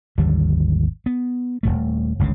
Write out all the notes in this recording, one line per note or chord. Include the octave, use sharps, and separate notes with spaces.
G#1 D#2 D3 G3
B3
D#1 F2 A3
G1 C#2 G2 C#3